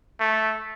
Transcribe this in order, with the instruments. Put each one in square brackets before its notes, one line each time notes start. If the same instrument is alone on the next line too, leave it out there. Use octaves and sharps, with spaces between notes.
[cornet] A3